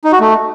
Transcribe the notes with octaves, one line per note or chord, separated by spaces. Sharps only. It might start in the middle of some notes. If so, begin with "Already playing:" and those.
D#4
F#4
A3